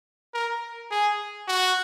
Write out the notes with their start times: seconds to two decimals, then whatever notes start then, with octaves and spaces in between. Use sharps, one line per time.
0.34 A#4
0.91 G#4
1.48 F#4